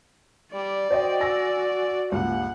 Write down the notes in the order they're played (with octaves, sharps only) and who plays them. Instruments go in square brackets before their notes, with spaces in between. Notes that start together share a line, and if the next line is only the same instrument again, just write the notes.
[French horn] G3 [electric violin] D5
[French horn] F#4 [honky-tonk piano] C5 D#5 G5
[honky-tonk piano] G#5 E6 A#6
[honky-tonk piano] C#2 G2 A#2 [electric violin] F#5